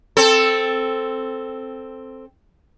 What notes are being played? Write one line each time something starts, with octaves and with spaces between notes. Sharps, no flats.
C4 A4